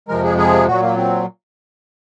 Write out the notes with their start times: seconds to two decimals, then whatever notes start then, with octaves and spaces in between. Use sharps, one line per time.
0.08 F2 C3 F3 G#3 A#4
0.24 G#4
0.38 G#4
0.67 A#2 F#3 F#4
0.82 A#3
0.96 C4